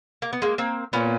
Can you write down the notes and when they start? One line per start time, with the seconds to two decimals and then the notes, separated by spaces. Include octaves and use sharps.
0.22 A#3
0.33 B3
0.42 G#3 A#3
0.58 A#3 C4
0.93 A#2 B3 C#4